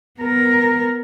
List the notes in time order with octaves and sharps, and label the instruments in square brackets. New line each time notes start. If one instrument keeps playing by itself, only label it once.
[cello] B3 A#4